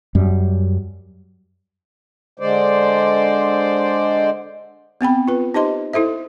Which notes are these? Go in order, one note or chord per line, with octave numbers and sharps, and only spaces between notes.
F#2 G3
D3 G#3 C5 D5
B3 C4 G5 B5
F4 B4
D#4 G4 C5 D#5 C6
E4 A4 C5 E5